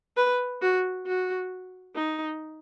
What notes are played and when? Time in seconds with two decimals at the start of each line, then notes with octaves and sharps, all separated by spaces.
0.17 B4
0.62 F#4
1.06 F#4
1.95 D#4